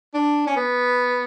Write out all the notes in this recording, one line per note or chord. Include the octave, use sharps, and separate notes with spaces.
D4
C#4
B3